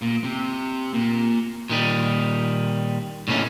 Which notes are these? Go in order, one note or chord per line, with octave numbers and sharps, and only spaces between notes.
A#2
C3
A#2
A#2 D#3 G3
A2 C3 A#3 C#4 D#4